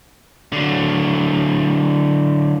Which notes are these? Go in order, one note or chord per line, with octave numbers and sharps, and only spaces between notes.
D3 F#3